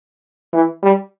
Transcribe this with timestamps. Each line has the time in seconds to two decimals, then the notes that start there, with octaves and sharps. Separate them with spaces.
0.53 E3
0.83 G3